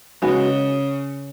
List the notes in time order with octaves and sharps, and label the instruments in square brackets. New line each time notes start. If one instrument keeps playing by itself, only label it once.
[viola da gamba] C#3 [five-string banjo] G#3 B3 D#4 F#4